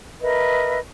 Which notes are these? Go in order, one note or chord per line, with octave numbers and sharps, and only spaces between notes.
A#4 B4 D#5 E5